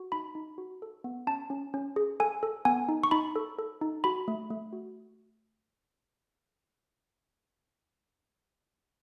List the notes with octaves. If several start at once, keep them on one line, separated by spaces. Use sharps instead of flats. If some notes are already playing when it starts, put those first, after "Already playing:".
Already playing: F#4
D#4 B5
D#4
F#4
A4
B3
C#4 A5
C#4
C#4
G#4
A4 G#5
A4
B3 G#5
D#4
C#6
D#4 B5
A4
A4
D#4
F#4 B5
A3
A3
F#4